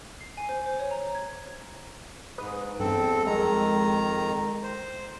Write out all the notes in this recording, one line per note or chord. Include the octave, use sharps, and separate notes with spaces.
C7
G#5
C5
C5
C#5
A#5
G#6
G#2 B4 D#6
E2 G2 C4 A4
F2 D#3 G#3 A#5
C5